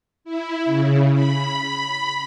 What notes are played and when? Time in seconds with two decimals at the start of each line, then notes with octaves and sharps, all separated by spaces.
0.24 E4
0.65 C#3
1.13 B5